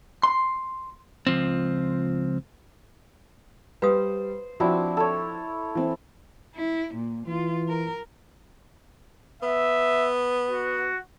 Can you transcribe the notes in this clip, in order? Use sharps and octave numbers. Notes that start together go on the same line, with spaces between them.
C6
C#2 F3 C4
G3 B4 C5 F5 D#6
F3 C4 D4 E4 F#4
A4 C#5
E3 C4
E4
A#2
E3 F4
A#4
B3 E5
F#4